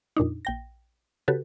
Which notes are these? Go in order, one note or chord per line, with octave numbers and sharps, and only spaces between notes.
F2 A#2 D4 D#4
A#1 G5 A#6
C#3 F#4 G4 A4 B4